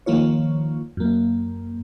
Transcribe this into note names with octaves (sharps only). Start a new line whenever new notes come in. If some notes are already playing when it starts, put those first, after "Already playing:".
D#3 F3 A#3 F4 C#5
F#2 A#3